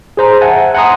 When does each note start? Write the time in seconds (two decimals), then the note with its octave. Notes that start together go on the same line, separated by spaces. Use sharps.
0.17 G#4 C5 A#5
0.41 E5 F#5 G#5 A5
0.74 F#5 G#5 A#5 C6 D#6